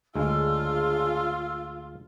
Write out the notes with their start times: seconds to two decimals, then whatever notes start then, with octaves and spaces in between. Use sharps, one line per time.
0.16 D2 C#3 G#3 D4 F4 G#4 E6 F6